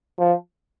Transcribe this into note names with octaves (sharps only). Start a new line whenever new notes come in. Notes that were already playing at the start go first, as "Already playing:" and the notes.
F3